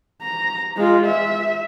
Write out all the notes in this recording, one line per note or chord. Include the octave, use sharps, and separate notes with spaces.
A#5
G#3 F4
E5